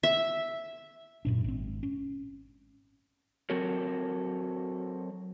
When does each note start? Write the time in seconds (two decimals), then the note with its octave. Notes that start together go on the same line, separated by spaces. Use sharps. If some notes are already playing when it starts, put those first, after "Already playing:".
0.03 E5
1.25 F#2 A#2 D4
1.44 G#1 C4
1.83 C#4
3.50 F#3 C4 F#4 A4 A#4 C#5